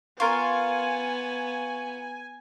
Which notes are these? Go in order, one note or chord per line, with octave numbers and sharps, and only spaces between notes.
B3 F4 A#4 G#5 C#6 A6